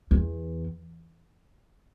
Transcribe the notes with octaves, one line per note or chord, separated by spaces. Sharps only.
E2